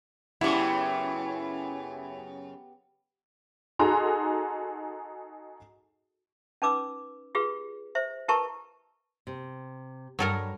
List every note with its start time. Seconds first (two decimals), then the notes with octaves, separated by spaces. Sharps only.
0.41 F#2 C#3 B3 E4 G4
3.79 D#4 F#4 G#4 A4 A#5 C6
6.62 C#4 D#4 B4 D6 E6
7.35 F4 G4 G#4 B4
7.95 C5 E5
8.28 E4 G4 A#4 B4 A5 C#6
9.27 C3
10.19 G2 F#3 A4 A#4